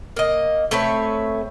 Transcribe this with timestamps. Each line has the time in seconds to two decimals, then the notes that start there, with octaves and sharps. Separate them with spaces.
0.17 A#3 D#5
0.71 A3 C4 B4 C#5